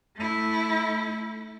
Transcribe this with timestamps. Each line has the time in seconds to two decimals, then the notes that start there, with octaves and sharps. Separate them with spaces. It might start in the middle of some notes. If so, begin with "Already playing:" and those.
0.16 A3 E4